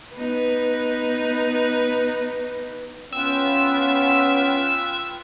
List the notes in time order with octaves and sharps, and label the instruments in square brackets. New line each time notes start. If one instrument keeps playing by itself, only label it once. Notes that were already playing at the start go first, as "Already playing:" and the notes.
[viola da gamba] B3 D#4 B4
[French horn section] B3 C#4 [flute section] F4 B4 G5 [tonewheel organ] E6